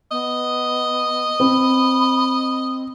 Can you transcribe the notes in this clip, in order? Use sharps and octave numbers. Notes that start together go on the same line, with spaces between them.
B3 D#5
C4 B5